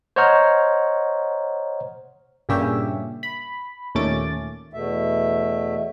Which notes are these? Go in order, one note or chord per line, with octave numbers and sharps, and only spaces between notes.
C5 C#5 D#5 F#5 A#5 F6
G2 A#2 C#3 C#4 G4 E5
B5
D#2 A#2 A3 C#4 D6 A6
E2 B2 A3 E5